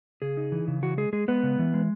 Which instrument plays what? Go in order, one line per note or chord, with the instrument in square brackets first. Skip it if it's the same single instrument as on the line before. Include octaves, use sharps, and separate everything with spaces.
[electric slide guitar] C#3 G#4
D#4
E3
C#3
E3 F#4
G#3 G#4
G#3 G#4
G#3 B3 B4
C#3
E3
G#3